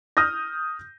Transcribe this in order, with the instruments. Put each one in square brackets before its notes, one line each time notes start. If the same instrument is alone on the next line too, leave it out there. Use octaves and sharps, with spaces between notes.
[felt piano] D#6 F6 G6 A#6